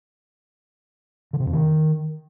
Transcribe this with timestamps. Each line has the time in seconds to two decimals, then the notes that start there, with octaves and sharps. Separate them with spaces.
1.33 D3
1.40 C3
1.46 F2
1.53 D#3